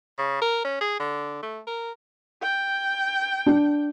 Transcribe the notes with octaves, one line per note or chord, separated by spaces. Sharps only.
C#3
A#4
C#4
G#4
D3
A3
A#4
G5
D4